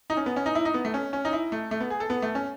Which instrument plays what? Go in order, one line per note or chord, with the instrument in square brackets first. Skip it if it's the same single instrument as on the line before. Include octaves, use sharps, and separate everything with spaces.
[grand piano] D#4
C#4
B3
C#4
D#4
E4
D#4
B3
A3
C#4
C#4
D#4
E4
A3
A3
B3
G#4
A4
B3
A3
C#4